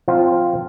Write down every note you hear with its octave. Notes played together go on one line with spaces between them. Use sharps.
F3 C4 F4